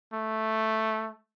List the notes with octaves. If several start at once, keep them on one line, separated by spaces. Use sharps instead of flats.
A3